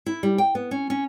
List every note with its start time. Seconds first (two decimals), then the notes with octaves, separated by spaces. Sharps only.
0.06 E4
0.23 G3
0.38 G5
0.55 B3
0.71 C#4
0.90 C#4